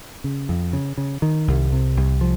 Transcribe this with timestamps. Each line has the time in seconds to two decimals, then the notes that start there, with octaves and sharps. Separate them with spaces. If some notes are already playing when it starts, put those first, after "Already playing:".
0.24 C#3
0.49 F2
0.73 C#3
0.98 C#3
1.22 D#3
1.48 C2
1.72 C3
1.97 C2
2.21 F3